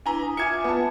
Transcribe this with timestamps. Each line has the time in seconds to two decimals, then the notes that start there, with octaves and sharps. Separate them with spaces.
0.06 D4 E4 B4 G#5 A#5
0.22 D#6
0.37 F4 E5 G#5 D6 G#6 C#7
0.64 B3 A5